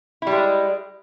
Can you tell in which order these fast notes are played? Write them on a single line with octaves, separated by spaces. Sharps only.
E4 G3 G#3